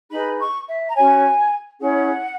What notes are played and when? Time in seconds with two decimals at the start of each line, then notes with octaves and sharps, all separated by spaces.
0.10 D#4 G#4 B4 B5
0.38 C#6
0.67 E5
0.87 A#5
0.95 C#4 F#4 C#5 G#5
1.80 C#4 E4 G#4 C#5 F#5